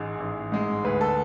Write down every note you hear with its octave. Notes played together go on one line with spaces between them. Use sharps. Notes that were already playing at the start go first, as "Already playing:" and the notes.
Already playing: A1 G#2 G#3 G#4
A1
G#2 G#3
D2 B4
A4